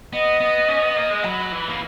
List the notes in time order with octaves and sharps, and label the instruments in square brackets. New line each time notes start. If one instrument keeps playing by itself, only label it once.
[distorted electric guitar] B3 [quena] D#5
[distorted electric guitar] B3
C#4
B3
A#3
G#3
[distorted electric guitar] F#3 [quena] B5
[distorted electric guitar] E3
A#3